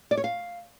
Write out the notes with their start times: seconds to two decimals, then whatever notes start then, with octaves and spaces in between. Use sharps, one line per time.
0.11 D5
0.17 C#5
0.24 F5